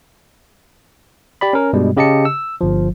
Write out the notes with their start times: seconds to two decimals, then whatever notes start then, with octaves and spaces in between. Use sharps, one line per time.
1.41 G4 D5 B5
1.53 C#4 A#4
1.73 G2 B2 G3 G#3
1.97 C#3 G4 D#5 A5 C#7
2.25 E6
2.61 G1 F3